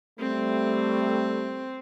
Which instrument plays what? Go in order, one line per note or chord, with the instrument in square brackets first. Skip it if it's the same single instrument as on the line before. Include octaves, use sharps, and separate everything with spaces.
[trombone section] G3 A3 [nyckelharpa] C4